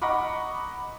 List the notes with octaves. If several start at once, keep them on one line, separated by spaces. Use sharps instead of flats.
D#5 F#5 A#5 B5 C#6 D6